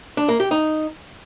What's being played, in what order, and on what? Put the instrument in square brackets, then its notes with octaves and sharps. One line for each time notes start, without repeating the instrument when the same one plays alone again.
[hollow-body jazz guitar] D4
A#3
G4
D#4